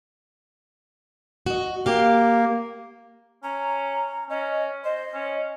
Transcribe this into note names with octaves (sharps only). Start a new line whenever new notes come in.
F#4 D#5
A#3 G4 F5
C#4 A#5
C#4 D#5
C5 D#5
C#4